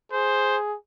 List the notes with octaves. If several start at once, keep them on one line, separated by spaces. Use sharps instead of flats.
G#4 C5